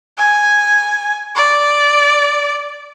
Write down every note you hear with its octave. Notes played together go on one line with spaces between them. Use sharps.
G#5
D5